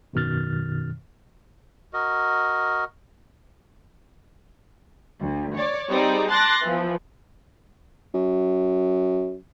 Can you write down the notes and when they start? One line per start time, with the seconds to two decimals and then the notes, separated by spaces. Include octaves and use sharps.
0.13 G#1 F#2 B2 D#3 F6 A6
1.93 F#4 A#4 D#5
5.21 D2
5.55 C#5 D5
5.89 G3 C4 D#4 G#4 D5
6.29 A5 C6 D6 F#6 A6 A#6
6.62 E3 F3 B3
8.14 F#2